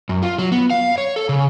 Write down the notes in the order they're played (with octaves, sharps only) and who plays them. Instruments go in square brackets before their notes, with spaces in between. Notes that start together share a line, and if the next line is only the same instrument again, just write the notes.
[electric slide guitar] F#2
F4
F#3
B3
F5
C#5
A4
C#3